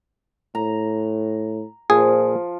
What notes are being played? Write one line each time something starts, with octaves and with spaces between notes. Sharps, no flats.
A2 A#5
A#2 F3 G#4